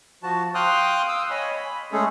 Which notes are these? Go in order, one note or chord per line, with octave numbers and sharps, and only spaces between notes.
F3 F#4 A5
F5 G5 C6 D#6 F6 F#6
F5 D#6 E6
C#5 D#5 G#5 B5
B5
G#3 A3 C#4 G#4 A4